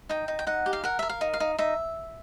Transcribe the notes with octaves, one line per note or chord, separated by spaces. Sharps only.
D#4 G5
D#4
G5
D#4 F#5
G4
F5
A#4 F#5
A#4 E5
F5
D#4
F5
D#4
D#4 E5